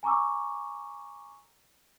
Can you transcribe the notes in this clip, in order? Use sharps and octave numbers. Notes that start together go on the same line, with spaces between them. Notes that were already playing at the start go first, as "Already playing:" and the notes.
G#5 A#5 C#6 D6 E6